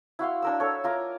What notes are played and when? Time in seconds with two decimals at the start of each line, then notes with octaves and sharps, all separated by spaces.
0.19 E4 F#4 F5 C6
0.42 D4 A#4 E6
0.60 A4 C#5
0.84 F4 A#4 D6